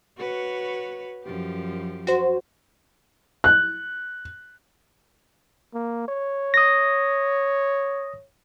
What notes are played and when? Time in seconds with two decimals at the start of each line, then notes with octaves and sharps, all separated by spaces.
0.17 F#4 B4 C#5
1.24 F#2 F3 G4
2.07 F#4 C5
3.44 F#6
5.74 A#3
6.08 C#5
6.54 D#6 A#6